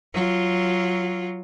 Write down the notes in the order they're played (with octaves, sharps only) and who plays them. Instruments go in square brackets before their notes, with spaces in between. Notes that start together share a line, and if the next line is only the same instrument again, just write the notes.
[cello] F#3 F4